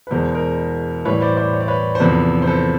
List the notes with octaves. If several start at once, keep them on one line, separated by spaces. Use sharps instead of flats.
B4
E2 B2 G#3 A#4 C5
A#4 C5
A2 E3 G3 B4 C#5
C5 D5
C5 D5
C#5
D5
B4 C#5
C5
E2 C3 F3 A4 B4
C5
A4 B4